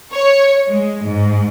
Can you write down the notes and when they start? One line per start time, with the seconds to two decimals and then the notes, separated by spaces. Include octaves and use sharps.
0.12 C#5
0.68 G#3
1.03 G#2